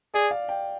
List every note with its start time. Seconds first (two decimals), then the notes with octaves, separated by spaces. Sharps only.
0.14 G#4 D5
0.31 F5
0.49 G5